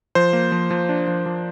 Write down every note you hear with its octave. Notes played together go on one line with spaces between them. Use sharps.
F3 C5
A#3
F3
F3
D4
F3
F3